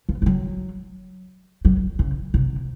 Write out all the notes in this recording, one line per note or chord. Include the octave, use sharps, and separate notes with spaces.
F3
G3
F#3
F#3
C#3
C3